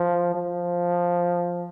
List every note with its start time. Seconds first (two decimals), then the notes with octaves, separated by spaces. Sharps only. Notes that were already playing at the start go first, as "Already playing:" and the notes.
Already playing: F3
0.35 F3